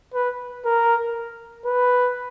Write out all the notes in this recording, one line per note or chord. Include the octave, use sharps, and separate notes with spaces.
B4
A#4
B4